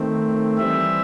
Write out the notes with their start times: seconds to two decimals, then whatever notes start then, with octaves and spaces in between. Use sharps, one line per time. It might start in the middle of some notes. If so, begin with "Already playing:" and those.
Already playing: D#3 A3 C4
0.58 E3 G3 C4 E5